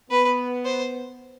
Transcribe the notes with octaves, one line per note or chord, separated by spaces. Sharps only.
B3 B4
C5